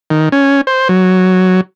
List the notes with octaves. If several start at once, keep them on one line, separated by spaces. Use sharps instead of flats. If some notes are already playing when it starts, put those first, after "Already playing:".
D#3
C#4
C5
F#3